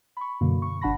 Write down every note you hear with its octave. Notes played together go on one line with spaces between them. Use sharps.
B5 C#6
F#2 B2 D3 F#3 A#3
C#6
G1 D4 F#5 A5 B5 A#6